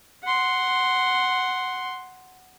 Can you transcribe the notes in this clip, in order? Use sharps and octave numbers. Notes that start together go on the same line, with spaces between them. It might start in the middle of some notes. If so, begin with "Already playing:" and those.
F#5 C6